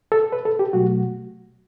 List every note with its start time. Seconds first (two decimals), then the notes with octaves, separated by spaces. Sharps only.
0.12 A4
0.32 B4
0.45 A4
0.59 G4
0.73 B2 F#3 A3 F#4